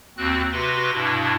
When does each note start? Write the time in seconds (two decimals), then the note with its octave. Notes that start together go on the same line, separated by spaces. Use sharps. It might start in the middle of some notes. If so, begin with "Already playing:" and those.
0.17 D#2 C4 F#4 F#6
0.52 C3 F#4 B4 C6 A#6
0.93 G2 B2 D4 E4